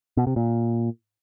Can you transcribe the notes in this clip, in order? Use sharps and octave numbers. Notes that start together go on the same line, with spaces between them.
B2
C3
A#2